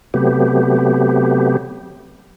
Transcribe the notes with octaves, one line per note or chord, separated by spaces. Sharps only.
C3 F#3 A3 B3 G4